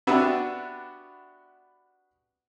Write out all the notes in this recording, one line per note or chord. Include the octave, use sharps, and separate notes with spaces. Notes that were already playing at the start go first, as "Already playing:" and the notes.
B3 D4 F#4 G4 B4 E5